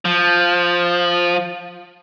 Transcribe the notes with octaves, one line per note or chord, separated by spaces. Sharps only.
F3